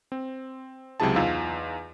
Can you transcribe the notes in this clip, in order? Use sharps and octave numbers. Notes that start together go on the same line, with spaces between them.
C4
C#2 C3 F#3 E4 G#4 A5
E2 D#4 F4 F5 E6